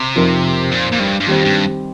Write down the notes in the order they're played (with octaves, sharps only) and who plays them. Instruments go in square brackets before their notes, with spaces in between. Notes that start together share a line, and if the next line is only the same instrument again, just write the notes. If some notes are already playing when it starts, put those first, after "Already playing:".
Already playing: [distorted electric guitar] C3
[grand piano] F2 F3 D#4 A#4
[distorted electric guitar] A#2
A#2
G2
G2
[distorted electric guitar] F2 [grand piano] D#3 G3 C4
[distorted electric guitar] G2